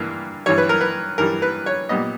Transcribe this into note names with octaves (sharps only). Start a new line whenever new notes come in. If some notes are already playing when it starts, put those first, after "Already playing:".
Already playing: G2 E3 A#3
G2 E3 G3 C#5
B4
A#4
B4
G2 E3 G3 A#4
B4
C#5
A#2 G3 B3 D#5